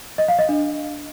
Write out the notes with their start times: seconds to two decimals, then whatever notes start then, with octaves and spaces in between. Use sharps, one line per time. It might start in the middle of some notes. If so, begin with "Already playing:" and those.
0.18 D#5
0.28 F5
0.39 D#5
0.49 D4